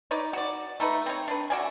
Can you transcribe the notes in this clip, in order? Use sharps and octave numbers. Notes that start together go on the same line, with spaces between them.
D#4 B4 C#5 D5
F#4 D5
A3 D#4 A4 B4
C4 C#5
D4 B4
A3 F#4 D5 G#5